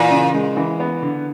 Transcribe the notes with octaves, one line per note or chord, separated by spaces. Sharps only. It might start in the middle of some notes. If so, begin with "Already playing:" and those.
Already playing: A#2 E3
C#3
G#3
E3
B3
D3